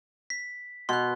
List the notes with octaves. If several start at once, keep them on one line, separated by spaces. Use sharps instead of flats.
B6
B2 C6 F#6